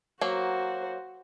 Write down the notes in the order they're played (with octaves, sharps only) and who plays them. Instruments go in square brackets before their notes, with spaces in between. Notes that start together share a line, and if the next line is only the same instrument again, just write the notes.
[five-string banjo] F#3 A#3 [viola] F#4 C5